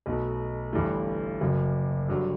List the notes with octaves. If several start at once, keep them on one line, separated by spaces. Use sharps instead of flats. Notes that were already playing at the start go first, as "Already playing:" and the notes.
B1 B2 A3
G1 G2 E3 A3
F#1 F#2 F#3
G2 D3 F#3